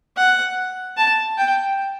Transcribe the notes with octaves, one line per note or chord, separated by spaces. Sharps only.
F#5
A5
G5